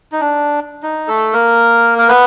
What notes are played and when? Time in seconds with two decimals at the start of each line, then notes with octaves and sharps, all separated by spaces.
0.12 D#4
0.20 D4
0.83 D#4
1.08 A3 A4
1.33 A#3 A#4
1.98 A#4
2.08 B3 B4